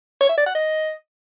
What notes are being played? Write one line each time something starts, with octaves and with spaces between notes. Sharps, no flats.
C#5
E5
D5
F#5
D#5